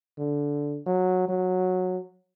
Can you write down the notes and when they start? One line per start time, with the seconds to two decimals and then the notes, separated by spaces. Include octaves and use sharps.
0.19 D3
0.86 F#3
1.29 F#3